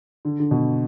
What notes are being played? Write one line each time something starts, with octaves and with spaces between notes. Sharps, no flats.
D3
D3
B2